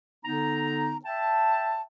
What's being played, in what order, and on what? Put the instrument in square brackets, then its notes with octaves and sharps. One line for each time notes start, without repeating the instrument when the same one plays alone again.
[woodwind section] D3 B3 D#4 A#5
E5 G5 A5